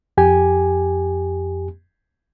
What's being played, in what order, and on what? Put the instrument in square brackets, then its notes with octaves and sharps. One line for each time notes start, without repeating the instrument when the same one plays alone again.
[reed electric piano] F2 G4 G#5